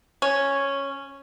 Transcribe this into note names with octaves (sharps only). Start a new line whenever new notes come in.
C#4